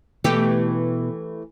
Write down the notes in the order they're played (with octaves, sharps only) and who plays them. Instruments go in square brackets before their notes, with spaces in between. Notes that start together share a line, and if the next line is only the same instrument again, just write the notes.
[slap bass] B2 [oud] E3 A3 G4